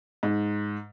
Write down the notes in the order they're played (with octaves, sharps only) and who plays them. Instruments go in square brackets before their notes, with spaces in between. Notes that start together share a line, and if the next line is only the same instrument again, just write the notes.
[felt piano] G#2